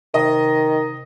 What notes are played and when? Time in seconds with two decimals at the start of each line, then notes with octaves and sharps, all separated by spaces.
0.14 C3 D#3 D#5